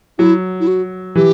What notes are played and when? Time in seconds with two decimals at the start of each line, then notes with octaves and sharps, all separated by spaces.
0.18 F#3 E4
0.60 E4
0.67 F#4
1.15 E3 G4